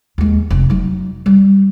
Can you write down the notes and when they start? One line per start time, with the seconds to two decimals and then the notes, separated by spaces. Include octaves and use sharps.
0.18 D#2 G#3
0.50 F1
0.70 F#3 D#4
1.26 G3